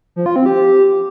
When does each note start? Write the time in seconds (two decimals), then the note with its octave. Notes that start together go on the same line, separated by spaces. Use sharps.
0.16 F3
0.26 F4
0.36 C4
0.46 G4